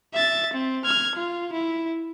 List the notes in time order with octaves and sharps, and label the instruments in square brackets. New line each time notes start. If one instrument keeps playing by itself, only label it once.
[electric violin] E5 A6
C4
F6 G#6
F4
E4